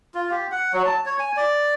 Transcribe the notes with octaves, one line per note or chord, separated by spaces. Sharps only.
F4
G4
F#5
F#3
A5
C#5
G#5
D5